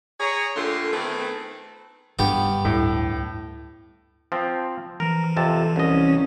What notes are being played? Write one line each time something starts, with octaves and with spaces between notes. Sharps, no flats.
G#4 C#5 A#5
A#2 D3 A3 F4 G4 C6
D#3 A3 B3 C4 G#4 B4
G2 D3 B3 G4
D2 A2
F3 C4
E3 F3 A#4
F2 C3 A5
C2 C#4 D#5